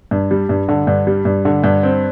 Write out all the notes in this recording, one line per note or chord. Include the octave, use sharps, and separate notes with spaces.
G2
G3
G2
D3
G2
G3
G2
D3
G2
C4